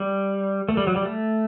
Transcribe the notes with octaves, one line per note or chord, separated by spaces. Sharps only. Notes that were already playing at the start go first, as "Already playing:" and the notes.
Already playing: G3
A3
G3
F#3
G3
A3